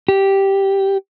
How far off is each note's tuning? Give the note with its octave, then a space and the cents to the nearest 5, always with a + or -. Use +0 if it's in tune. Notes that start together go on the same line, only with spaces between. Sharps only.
G4 -5